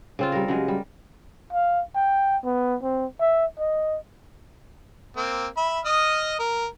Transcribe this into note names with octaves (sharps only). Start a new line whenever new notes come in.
C#3 C4 F4
G3 A#4
C#3 F#3 G#3
G3
F5
G5
B3
C4
E5
D#5
A#3 C4
E5 B5
D#5 D#6 F6
A#4